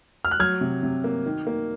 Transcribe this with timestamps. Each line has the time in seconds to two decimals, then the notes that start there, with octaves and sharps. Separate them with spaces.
0.25 F6
0.31 F#6
0.39 F#3 F6 G#6
0.61 C3
0.83 C3
1.04 A#3
1.26 D#3
1.47 A#3